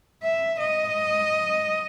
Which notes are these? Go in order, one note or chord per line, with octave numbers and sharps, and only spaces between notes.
E5
D#5